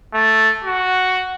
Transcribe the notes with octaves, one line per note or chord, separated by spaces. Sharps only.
A3
F#4